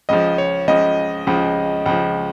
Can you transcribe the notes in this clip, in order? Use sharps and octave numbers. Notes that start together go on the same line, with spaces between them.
C#2 C#3 F3 D#5
C#5
C#2 C#3 F3 D#5
C#2 C#3 F3
C#2 C#3 F3